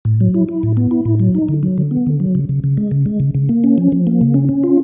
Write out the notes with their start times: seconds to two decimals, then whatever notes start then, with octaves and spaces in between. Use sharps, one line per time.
0.05 A2
0.21 F#3
0.34 E4
0.49 E4
0.63 A2
0.77 B3
0.91 E4
1.05 A2
1.20 F#3
1.35 D#4
1.48 D3
1.63 F#3
1.78 D3
1.91 B3
2.07 D3
2.20 F#3
2.35 C#3
2.49 C#3
2.64 C#3
2.77 G#3
2.91 C#3
3.06 G#3
3.20 C#3
3.35 C#3
3.49 A#3
3.64 C#4
3.78 F3
3.92 F3
4.07 A#3
4.21 C#3
4.34 C#4
4.49 C#4
4.64 F4